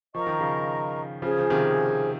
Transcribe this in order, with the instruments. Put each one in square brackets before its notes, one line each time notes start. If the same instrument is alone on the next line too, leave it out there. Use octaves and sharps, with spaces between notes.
[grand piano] F3 [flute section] A#4 D#5 A#5 C#6
[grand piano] D#3
C#3 F3
[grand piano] C#3 F3 [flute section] C#4 G#4 C5
[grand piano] F3
C3 D#3